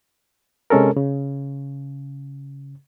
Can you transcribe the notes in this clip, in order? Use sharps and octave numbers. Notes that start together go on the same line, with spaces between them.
C3 G#3 C#4 A4 A#4
C#3